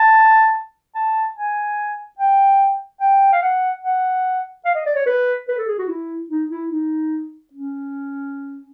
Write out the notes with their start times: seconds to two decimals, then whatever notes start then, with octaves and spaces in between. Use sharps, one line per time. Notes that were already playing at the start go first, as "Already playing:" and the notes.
Already playing: A5
0.95 A5
1.37 G#5
2.19 G5
3.00 G5
3.32 F5
3.42 F#5
3.83 F#5
4.65 F5
4.75 D#5
4.86 D5
4.96 C#5
5.06 B4
5.48 B4
5.58 A4
5.68 G#4
5.78 F#4
5.88 E4
6.30 D#4
6.51 E4
6.71 D#4
7.53 C#4